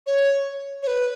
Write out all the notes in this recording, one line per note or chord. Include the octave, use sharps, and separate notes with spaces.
C#5
C#5
B4